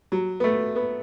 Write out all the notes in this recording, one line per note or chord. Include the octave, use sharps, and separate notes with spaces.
F#3
B3
A3
B3